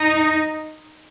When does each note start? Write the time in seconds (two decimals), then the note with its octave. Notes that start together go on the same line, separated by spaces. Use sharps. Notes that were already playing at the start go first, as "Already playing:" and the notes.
Already playing: D#4